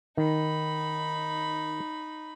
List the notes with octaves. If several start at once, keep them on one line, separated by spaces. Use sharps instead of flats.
D#3 D#4 B5